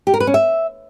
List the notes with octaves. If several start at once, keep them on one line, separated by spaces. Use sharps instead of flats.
G4
A#4
B4
C#4
E5